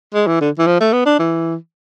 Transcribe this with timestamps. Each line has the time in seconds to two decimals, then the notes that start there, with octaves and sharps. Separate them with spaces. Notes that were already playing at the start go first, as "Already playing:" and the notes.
0.15 G#3
0.27 E3
0.41 D3
0.58 E3
0.67 F3
0.80 A3
0.93 B3
1.06 D4
1.19 E3